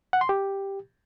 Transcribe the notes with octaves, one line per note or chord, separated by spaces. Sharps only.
F#5
C6
G4